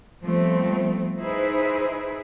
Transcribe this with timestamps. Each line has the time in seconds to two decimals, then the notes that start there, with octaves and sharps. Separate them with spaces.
0.24 F3 G3 A3 B3 C4
1.18 D#4 E4 G#4 B4 C5 E5